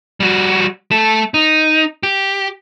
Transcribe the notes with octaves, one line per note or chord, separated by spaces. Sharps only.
G3 F#4
A3 A4
D#4
G4